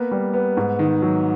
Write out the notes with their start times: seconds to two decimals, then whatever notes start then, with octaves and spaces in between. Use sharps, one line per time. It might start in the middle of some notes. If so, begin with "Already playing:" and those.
Already playing: A#3 B3
0.11 G3
0.33 B3
0.57 G#2
0.79 D#3
1.02 F#3